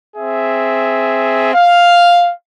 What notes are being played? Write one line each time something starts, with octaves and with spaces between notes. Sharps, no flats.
C4 G#4 E5
F5